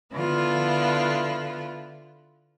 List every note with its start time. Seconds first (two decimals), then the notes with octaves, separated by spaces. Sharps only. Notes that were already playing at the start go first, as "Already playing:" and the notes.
0.13 D3 B3 E4 F4